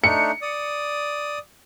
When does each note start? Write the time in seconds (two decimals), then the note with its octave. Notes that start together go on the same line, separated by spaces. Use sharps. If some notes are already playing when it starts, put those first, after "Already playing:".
0.04 A3 D4 D#4 C#7
0.42 D5 D#6